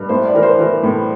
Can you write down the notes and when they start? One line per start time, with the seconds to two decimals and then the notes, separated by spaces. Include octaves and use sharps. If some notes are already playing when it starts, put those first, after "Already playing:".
Already playing: G2
0.09 A2 C5
0.25 D5
0.34 E3 A#4
0.43 C5
0.59 E3 A#4
0.83 A2